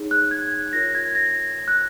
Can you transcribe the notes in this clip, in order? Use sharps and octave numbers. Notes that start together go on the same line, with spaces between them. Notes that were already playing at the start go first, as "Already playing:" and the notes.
Already playing: D#4 G#4 C#5
F#6
G#6
F4 A#4 C#5 A#6
G#6
A#6
F#6